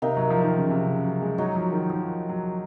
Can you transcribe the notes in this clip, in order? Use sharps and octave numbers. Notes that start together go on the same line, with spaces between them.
C3 A#3 D#4 A#4
F#3
F3
D#3
C#3
C3
C#3
F#3
G#3
F#3 D#4 F#4 C#5
F3
D#3
F3
F#3